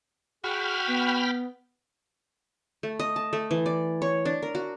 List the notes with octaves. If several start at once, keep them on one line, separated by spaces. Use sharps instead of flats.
F#4 G#4 G5 B5 F6
B3
A3
D#5
A5
A3
E3
D5
C#5
D4
A#4
F#4